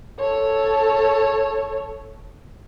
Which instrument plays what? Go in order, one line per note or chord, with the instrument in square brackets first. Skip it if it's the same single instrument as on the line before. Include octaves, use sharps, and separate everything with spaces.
[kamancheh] A4 C#5